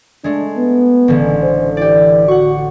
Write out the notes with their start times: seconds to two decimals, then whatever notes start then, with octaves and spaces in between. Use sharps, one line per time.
0.24 G#3 A3 D4
0.57 B3
1.08 A1 D3 G#3
1.43 C5
1.77 E3 G4 D5
2.28 F#4 F#5 C#6